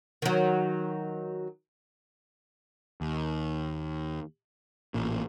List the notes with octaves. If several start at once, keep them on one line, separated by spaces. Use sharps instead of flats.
D#3 F#3
D#2
A1 A#2